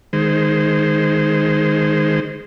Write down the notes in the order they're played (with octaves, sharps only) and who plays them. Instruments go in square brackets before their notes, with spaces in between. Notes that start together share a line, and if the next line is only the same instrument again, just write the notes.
[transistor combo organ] D#3 G#3 C5